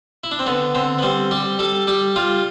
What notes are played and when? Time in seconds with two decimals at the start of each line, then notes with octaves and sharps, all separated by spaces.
0.24 E4
0.31 D4
0.39 C4
0.46 D3 B3
0.75 D3 C4
0.99 B3
1.02 G3 C4
1.31 G3 G4
1.59 G3 A4
1.87 G3 G4
2.16 G3 F4